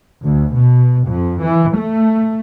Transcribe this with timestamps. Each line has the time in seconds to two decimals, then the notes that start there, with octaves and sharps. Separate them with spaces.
0.24 D2
0.56 B2
1.08 F2
1.43 E3
1.77 A3